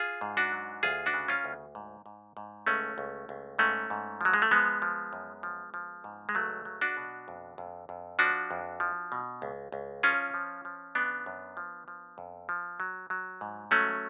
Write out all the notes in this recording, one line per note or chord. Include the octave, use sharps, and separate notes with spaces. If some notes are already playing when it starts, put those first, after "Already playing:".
Already playing: F4 G#4
G#2
D4 F#4
F#3
D2 F4 G#4
D4 F#4
C#3
C#4 F4
D2
G#2
G#2
G#2
C#2 A3 C#4
C#2
C#2
G#2 A3 C#4
G#2
F3 F#3
G#3
A3
F3 G#3 B3
F3
F#2
F3
F3
G#2
G#3
C#2 F#3 A3
F#3
D4 F#4
B2
F2
F2
F2
F3 D4 F#4
F2
F3
B2
C#2
C#2
F3 C#4 F4
F3
F3
C#3 B3 D4
F#2
F3
F3
F2
F3
F#3
F#3
G#2
F#3 A3 C#4